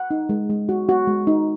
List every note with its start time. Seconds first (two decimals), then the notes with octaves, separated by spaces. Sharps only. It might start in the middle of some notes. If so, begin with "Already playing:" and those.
Already playing: F#5
0.11 D#4
0.29 G#3
0.50 G#3
0.69 F#4
0.89 F#4
1.07 G#3
1.27 D#4